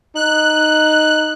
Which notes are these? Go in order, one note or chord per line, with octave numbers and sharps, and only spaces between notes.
D#4 F#6